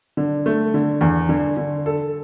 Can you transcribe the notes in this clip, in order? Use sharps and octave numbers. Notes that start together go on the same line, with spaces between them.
D3
A3
D3
E2
D3
D3
A4